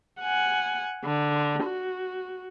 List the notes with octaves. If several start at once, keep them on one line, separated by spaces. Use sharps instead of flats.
F#5 G#5
D3
F#4